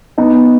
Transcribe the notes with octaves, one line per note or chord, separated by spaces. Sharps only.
B3 D#4